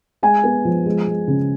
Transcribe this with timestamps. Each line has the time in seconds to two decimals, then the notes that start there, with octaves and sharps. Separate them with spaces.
0.23 G#3 G#5
0.44 B3
0.65 F3
0.86 G#3
1.07 G#3
1.28 C#3